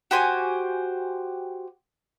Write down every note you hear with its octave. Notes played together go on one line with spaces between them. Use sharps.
F#4 G4 C5 G#5